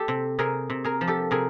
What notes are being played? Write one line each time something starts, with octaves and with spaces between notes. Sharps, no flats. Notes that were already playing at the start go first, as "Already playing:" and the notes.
Already playing: G4 A4
C3
C3 G#4 A#4
C3
G#4 A#4
F3
G4 A4
C3 G#4 A#4